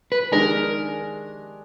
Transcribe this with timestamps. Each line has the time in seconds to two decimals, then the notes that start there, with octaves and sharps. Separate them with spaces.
0.12 B4
0.31 D#3 G#3 D4 G#4 A#4